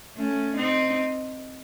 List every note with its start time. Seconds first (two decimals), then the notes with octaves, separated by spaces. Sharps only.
0.16 A3 C#4
0.57 C4 D#4